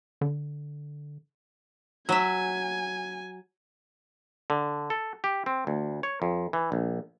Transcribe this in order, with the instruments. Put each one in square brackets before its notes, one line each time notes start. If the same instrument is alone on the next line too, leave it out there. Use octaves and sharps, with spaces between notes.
[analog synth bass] D3
[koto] F#3 E5 [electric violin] G#5
[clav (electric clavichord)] D3
A4
G4
C4
D2
C#5
F2
E3
A#1